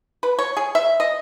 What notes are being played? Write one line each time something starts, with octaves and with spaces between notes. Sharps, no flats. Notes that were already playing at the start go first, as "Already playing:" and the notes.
B4
C#5
G#4
E5
D#5